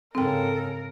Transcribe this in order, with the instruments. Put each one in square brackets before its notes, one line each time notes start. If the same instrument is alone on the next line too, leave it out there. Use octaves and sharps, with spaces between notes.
[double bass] G#2 C#3 [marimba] C4 G5 [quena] A4 [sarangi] A#4